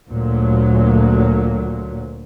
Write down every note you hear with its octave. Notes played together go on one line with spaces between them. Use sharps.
D2 A#2 F#3